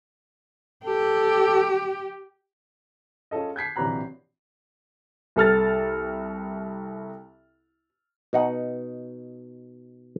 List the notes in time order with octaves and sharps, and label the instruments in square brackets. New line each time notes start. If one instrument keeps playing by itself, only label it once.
[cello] G4 [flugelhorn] A4
[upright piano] C#4 F4 G#4 A4 D#5
G6 G#6 B6 C7
A#1 C3 E3 F#3 A#5 F#6
[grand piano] C2 A4 F6 A6
[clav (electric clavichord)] B2 D#4 F#5